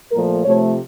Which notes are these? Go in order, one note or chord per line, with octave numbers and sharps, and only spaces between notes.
A#2 F3 A3 A#4
C3 F3 A3 C#5